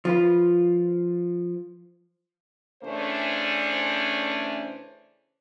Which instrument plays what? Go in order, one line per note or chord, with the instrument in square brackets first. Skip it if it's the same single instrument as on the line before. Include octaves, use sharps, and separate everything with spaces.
[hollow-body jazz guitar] F3 F4 B4
[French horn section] C#3 E3 A3 C#4 D4 C5